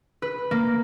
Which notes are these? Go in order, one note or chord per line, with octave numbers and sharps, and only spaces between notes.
B4
A#3